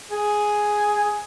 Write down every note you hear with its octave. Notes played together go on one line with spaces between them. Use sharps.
G#4